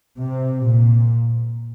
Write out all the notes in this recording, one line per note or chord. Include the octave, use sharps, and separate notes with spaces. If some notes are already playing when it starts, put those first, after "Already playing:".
C3
A#2